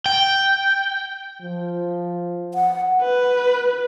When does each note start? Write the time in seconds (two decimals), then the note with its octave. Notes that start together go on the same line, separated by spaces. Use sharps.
0.06 G5
1.41 F3
2.54 F#5
3.02 B4